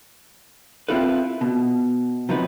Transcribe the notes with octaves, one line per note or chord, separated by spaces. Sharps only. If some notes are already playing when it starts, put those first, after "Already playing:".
C4 C#4 E4 F4 A4 B4
B2
C3 F3 F#3 D#4 B4